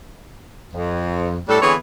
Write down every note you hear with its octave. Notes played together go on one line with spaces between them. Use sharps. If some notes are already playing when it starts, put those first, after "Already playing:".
F2
A2 G3 A3 D4 A4
D3 E3 B3 C4 G#4 C#5